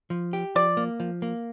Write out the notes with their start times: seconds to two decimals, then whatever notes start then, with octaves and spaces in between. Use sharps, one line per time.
0.10 F3
0.33 G4
0.55 F3 D5
0.77 A#3
1.00 F3
1.22 A#3